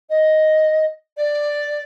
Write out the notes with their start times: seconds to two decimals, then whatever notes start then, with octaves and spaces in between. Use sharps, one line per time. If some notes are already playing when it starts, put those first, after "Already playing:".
0.10 D#5
1.17 D5